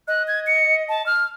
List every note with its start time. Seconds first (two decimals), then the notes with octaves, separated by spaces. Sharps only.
0.08 D#5 F#6
0.27 G#6
0.47 C#7
0.89 A5
1.06 F6